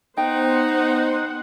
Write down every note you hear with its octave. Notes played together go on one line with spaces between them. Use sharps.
B3 D#4 C5 F#5 G5